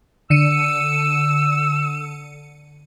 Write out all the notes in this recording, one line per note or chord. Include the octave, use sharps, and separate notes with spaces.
D3 E6 C#7 D#7